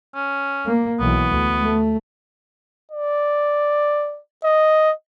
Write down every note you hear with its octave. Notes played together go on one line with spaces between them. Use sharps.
C#4
A#3
B1 E3 B3
D2
A3
D5
D#5